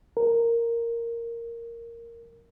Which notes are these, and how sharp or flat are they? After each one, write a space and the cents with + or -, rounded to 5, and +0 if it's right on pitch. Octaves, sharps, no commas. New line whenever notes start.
A#4 -5